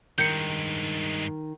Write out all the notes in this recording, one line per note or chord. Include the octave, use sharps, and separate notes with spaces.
G2 D#3 G#3 G6 C#7